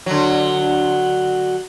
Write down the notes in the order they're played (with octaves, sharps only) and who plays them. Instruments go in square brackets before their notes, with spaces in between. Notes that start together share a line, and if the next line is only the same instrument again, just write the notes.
[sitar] D3 F#3